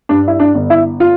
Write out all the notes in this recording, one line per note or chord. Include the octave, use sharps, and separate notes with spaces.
G2 D4
E4
D4
G1
E4
F4